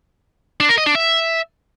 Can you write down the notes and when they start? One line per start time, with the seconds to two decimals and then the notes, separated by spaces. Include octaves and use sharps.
0.60 D4
0.69 A#4
0.78 D#5
0.86 D4
0.95 E5